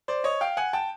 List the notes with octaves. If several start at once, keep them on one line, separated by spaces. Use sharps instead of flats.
C5 D5
C#5 D#5
F5 G5
F#5 G#5
G5 A5